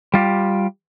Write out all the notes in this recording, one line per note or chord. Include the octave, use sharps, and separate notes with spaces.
G3 F4 G4